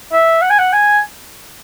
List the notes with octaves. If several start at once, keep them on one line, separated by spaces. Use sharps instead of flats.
E5
F#5
G#5
F#5
G#5